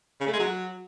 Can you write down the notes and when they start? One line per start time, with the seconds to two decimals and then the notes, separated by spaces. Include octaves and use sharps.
0.20 C#3
0.27 A3
0.33 G#3
0.40 F#3